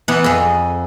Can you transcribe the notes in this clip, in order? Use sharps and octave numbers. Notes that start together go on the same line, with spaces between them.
E3 B3
F2 G#4